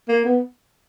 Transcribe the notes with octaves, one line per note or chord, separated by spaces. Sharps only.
A#3
B3